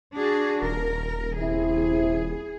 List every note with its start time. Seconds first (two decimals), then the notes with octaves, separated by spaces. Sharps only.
0.15 D4 F#4 G#4
0.62 D#1 A#4
1.39 C3 E4 G#4